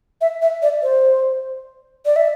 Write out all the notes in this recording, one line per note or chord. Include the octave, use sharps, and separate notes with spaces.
E5
E5
D5
C5
D5
E5